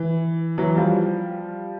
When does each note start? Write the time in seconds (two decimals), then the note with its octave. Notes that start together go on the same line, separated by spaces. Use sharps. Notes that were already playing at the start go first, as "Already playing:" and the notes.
Already playing: E3
0.58 E3 F#3
0.76 F3 G3